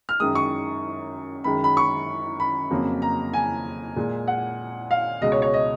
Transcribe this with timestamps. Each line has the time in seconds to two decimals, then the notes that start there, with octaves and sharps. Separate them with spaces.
0.09 F6
0.20 F#2 D#3 G#3 D#6
0.35 C#6
1.44 F#2 D#3 G#3 B5
1.64 B5
1.77 C#6
2.40 B5
2.70 F2 C#3 F#3 A#3
3.02 A#5
3.33 G#5
3.96 A#2 G#3
4.28 F#5
4.91 F5
5.21 C#2 B2 G#3 D#5
5.32 C#5
5.42 C#5
5.54 D#5